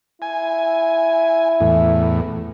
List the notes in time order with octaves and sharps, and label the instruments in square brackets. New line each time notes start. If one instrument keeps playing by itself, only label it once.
[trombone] E4 [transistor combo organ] G#5
[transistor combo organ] E2 A2